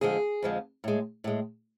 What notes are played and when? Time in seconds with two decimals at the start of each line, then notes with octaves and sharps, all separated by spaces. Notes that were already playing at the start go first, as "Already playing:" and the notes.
0.01 F2 D3 F3 G#3 G#4
0.42 F2 D3 F3 G#3
0.84 A2 G#3
1.24 A2 G#3